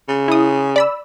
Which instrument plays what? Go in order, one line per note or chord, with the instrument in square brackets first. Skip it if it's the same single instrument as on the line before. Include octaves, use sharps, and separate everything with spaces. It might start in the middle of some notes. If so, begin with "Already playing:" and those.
[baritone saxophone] C#3
[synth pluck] E4 D#6
D5 B5 E6